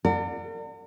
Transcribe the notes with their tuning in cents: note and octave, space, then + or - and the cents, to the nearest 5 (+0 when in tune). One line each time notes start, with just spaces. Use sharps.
A#4 -45 D5 +15 F#5 -30